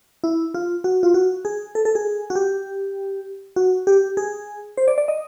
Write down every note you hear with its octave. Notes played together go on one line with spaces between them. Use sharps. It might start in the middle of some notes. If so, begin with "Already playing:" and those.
E4
F4
F#4
F4
F#4
G#4
A4
A4
G#4
F#4
G4
F#4
G4
G#4
C5
D5
D5
D#5